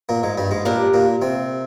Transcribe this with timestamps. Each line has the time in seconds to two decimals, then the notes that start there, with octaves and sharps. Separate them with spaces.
0.09 A#2 A#3
0.23 G#2 G#3
0.37 G2 G3
0.51 G#2 G#3
0.65 A#2 G3 A#3 D4 G4 A#4
0.94 A#2 A#3
1.22 C3 C4